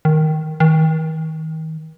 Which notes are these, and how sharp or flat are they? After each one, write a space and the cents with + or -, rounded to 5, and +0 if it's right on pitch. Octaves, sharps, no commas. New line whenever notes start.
D#3 +0
D#3 +35